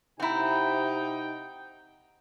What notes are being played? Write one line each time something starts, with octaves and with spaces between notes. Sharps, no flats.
C3 C4 D#4 E4 F#5 G5 A#5